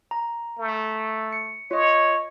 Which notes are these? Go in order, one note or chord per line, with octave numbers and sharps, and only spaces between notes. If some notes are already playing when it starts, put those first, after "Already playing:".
A#5
A3
C#7
F4 C#5 D#5